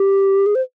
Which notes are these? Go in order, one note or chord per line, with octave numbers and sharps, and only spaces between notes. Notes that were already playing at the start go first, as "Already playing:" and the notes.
Already playing: G4
G#4
C5